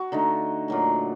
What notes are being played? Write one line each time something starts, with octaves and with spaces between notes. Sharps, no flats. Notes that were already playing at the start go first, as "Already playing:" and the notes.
Already playing: F#4
D3 A3 D#4
A#2 F#3 A3